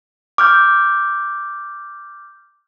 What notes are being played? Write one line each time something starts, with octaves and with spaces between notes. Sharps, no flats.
D6 F6 G6